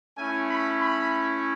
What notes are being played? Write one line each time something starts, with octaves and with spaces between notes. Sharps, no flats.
A3 C#4 E4 G#5
B5
B5